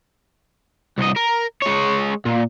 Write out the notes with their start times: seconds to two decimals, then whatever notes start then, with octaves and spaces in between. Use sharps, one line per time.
0.98 C2 D#5
1.16 A#4
1.62 G#3 C#5
2.25 A#2